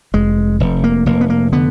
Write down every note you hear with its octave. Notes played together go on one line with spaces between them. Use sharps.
F1 G#3
F1
A#3
F1 A#3
B3
A#3
D3 B3